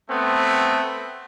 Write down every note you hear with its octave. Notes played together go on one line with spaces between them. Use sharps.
A3 B3 C4